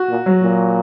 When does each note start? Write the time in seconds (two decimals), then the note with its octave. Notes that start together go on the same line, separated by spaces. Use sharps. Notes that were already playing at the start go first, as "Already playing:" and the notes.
Already playing: F#4
0.09 A#2
0.26 F#3
0.42 A#2